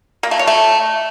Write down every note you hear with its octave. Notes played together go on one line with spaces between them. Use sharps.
A#3
A3
C#5
A3